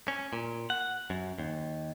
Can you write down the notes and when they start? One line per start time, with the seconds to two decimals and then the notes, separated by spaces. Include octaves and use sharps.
0.08 C#4
0.33 A#2
0.70 F#5
1.10 F#2
1.38 D#2